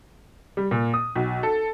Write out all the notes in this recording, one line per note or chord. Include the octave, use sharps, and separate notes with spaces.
G3
A#2
D#6
B1
A4